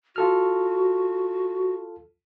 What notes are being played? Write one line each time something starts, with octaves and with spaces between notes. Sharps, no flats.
F4 F#4 A4 F6